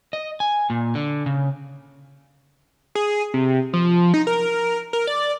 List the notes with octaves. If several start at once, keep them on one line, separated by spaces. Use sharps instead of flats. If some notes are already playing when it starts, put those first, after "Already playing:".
D#5
G#5
A#2
D3
C#3
G#4
C3
F3
D#4
A#4
A#4
D5